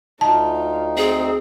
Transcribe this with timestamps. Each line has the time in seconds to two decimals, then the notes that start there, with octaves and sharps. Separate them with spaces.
0.21 D2 D#4 F4 A5
0.97 C4 G#4